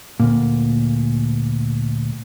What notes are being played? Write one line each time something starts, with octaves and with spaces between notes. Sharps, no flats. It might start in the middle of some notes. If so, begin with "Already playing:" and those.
D2 A#2